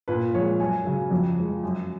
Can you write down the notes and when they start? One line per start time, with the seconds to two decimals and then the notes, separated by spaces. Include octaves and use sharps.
0.08 A#2 B4
0.34 F3 G#3 C#5
0.60 F#2 G#5
0.85 C#3 F#3
1.11 F2
1.38 F3 G#3
1.63 F#2